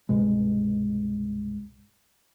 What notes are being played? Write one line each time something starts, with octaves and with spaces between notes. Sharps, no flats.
C2 G2 B2 G#3